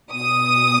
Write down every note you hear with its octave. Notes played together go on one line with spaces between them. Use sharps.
B2 D#6